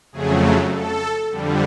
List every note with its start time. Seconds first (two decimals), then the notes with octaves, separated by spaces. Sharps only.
0.12 F2 C#3 F#3 A3 G#4
0.72 A4
1.30 F2 D3 G3